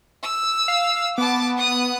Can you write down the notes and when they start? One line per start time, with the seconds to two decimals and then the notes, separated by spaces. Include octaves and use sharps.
0.23 E6
0.68 F5
1.18 B3 A5 D6
1.58 D#6 F#6